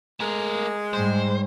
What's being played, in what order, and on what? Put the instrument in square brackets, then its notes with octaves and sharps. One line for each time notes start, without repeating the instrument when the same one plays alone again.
[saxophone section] G#3 [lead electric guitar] A3 A#4
[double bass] G#2 G3 [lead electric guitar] C5